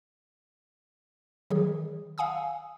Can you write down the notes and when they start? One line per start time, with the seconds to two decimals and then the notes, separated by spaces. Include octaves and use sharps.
1.51 D#3 E3 F#3 G#4
2.18 F5 F#5 G#5 D#6 E6